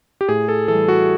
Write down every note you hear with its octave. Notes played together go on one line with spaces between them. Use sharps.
G4
A2 G#4
A4
E3 G3 A4
F#4